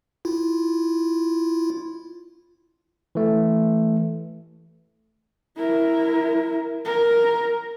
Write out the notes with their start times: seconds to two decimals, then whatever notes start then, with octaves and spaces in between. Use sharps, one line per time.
0.25 E4 F4
3.15 E3 A3
5.57 E4 A#4
6.85 A#4